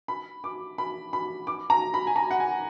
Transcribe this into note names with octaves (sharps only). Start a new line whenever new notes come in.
B5
D6
B5
B5
D6
A#5
B5
G#5
A#5
F#5
G#5